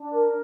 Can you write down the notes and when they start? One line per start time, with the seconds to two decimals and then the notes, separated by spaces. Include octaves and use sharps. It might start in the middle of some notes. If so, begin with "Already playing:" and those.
Already playing: D4
0.14 A#4